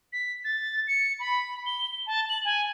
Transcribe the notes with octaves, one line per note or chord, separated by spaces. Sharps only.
B6
A6
C#7
B5
G7
A5
F#7
G#5